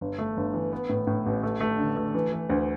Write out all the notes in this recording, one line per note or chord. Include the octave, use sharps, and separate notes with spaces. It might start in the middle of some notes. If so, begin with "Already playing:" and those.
G1
A3
G1
E3
B3
A2
A2
A1
A3
A3
D3
A3
E3
E3
D2